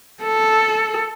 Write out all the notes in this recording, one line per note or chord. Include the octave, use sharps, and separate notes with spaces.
A4